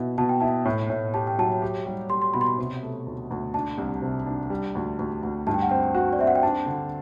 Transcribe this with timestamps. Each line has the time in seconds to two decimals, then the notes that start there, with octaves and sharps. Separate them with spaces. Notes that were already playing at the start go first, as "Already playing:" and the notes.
Already playing: B2 E4
0.18 B2 A5
0.29 G5
0.40 E4 A5
0.65 A2
0.90 A2
1.14 G4 A5
1.27 G5
1.39 F#3 A5
1.62 G4
1.86 G3
2.10 G3 C6
2.22 C6
2.34 B2 B5
2.41 C6
2.46 B5
2.58 C3
2.83 A3
3.06 D2
3.31 D2
3.54 D4 A5
3.78 C2
4.02 C3
4.26 D4
4.50 G3
4.75 D2
4.99 D2
5.23 D2
5.47 G2 A5
5.54 G5
5.62 F#5
5.69 C4 G5
5.95 F#4
6.13 D5
6.19 C4 E5
6.27 F#5
6.35 G5
6.43 D4 A5
6.66 D3